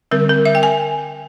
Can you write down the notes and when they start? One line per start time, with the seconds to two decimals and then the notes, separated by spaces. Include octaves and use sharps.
0.11 D3 G3 C4 A#4
0.29 A#4
0.45 E5
0.55 G5
0.63 G#5